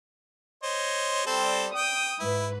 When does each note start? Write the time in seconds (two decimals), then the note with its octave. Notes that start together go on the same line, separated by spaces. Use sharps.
0.63 C5 C#5 D#5
1.26 G3 C4 A4 C5
1.75 G5 D#6
2.20 G#2 E4 B4